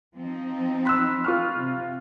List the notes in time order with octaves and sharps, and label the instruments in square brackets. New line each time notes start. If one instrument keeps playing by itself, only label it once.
[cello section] F3 C4 D#4
[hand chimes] B5 C6 F#6 [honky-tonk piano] E6 B6
[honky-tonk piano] F4 C#6 F6
[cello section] C3